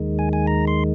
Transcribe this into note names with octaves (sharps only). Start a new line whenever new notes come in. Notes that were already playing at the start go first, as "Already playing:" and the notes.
Already playing: D#2 D#3 G#3
G#5
G#5
A#5
C6